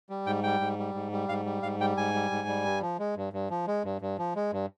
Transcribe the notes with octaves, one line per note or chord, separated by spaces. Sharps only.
G3
G#2 G5
G3 G5
G#2
G3
G#2
G3
G#2 F5
G3
G#2 F5
G3 G5
G#2 G#5
G3
G#2
G3
G2
F3
G#3
G2
G2
F3
G#3
G2
G2
F3
G#3
G2